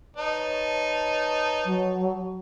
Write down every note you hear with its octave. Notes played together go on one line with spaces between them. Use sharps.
D#4 B4 C#5 A5
F#3